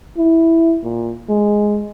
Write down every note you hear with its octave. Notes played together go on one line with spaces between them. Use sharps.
E4
A#2
G#3